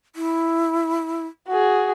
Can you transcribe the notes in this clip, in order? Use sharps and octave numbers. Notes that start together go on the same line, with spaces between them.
E4
F#4 G#4